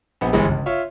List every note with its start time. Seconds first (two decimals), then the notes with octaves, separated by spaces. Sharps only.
0.21 A#1 B3
0.33 G1 E3 G#3
0.49 C#2
0.66 F4 C#5 E5